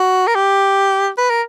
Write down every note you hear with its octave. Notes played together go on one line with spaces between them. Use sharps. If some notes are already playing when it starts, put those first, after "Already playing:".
Already playing: F#4
A#4
G4
B4
A#4